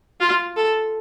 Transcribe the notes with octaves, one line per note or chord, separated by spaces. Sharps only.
F4
A4